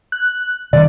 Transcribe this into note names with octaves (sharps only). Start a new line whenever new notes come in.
F#6
C3 D#3 G3 D5